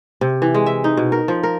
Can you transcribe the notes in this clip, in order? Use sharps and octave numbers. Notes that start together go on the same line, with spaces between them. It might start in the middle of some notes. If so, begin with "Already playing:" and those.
C3
E3
G#3
E5
D#4
B2
A#4
F3
A#4